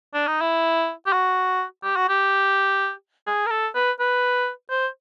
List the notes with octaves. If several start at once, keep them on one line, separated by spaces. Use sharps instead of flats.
D4
D#4
E4
G4
F#4
G4
F#4
G4
G#4
A#4
A4
B4
B4
C5